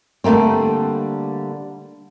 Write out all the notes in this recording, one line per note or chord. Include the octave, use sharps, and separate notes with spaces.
D3 G3 A3 A#3 C4